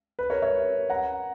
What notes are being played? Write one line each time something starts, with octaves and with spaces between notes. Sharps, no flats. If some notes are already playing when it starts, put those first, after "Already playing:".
B4
A#4 C#5
C#5 E5
F#5 A#5